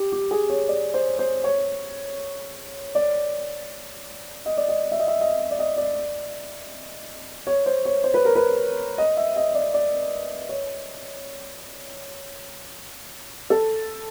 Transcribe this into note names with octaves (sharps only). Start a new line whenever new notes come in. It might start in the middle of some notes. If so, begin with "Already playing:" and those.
Already playing: G4
G4
G#4
C#5
D5
C5
C5
C#5
D5
D#5
D5
D#5
E5
D#5
E5
D#5
D5
D#5
D5
C#5
C5
C#5
C5
B4
A#4
B4
D#5
E5
D#5
D5
D5
C#5
A4